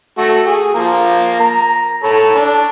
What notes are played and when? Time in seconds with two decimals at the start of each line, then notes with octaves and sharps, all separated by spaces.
0.18 A3 F#4
0.46 G#4
0.74 F3 A#3
1.40 A#5
2.03 A4 C#5 B5
2.35 D4